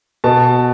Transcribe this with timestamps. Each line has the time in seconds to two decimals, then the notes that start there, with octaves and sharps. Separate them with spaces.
0.24 B2 A5